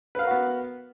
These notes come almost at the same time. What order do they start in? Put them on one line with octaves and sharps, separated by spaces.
B4 F5 A#4 F#4 B3